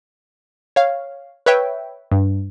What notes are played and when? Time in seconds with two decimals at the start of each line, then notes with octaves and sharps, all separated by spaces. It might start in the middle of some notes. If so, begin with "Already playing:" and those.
0.76 C#5 F5
1.46 B4 C#5 E5 G5
2.11 G2